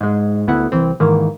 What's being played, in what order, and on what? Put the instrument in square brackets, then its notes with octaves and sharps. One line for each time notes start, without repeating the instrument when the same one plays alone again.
[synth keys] G#2 G#3
D2 B3 E4 F#5
C2 E3 C4
G#2 D#3 E3 A#3